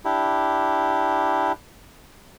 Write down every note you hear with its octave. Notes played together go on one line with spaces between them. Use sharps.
D4 E4 G4